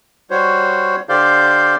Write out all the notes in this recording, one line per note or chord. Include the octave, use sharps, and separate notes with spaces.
G3 F#4 C5 C#5
D3 G4 C5 D5 F5 G6